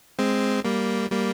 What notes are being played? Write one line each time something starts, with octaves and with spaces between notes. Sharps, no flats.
G#3 C4
G3 A#3
G3 A#3